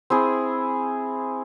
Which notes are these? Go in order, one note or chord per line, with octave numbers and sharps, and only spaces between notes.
C4 E4 G#4